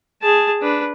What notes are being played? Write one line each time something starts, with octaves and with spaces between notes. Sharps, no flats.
G#4 A5
D4 B4